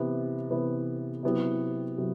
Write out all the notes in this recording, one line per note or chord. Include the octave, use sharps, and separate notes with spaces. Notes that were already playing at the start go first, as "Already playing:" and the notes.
Already playing: C3 E3 B3 E4
C3 E3 B3 E4
C3 F#3 B3 E4 G4
C3 F#3